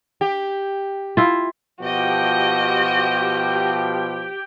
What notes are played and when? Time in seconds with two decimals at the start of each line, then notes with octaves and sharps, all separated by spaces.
0.21 G4
1.17 E4 F4
1.82 B2 F3 F#4 G4 D#5 G5